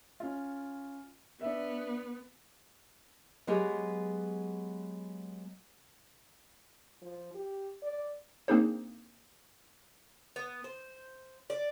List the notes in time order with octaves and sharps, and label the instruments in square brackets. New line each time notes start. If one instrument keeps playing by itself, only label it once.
[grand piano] C#4 F4
[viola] B3 [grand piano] D4 E5
[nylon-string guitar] F#3 G#3 B3 F4 G4 G#4
[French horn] F3
G4
D5
[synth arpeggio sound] A#3 C4 D4 D#4 G#4 C5
[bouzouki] B3
C5
D5